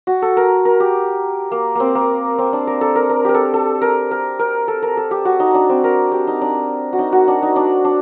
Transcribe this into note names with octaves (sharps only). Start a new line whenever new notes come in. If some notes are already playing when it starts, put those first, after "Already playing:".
F#4
A4
A#4
A#4
G4
A#3
A#3 C4
A#3
C4
D4
A#4
A4
A#4
A#4
G4 A#4
A4
A4
A#4
A#4
A#4
A4
A#4
A4
G4
F#4
D#4
D4
C4
A#4
G4
D#4
D4
F#4
D#4
F#4
D4
D#4
D4
D4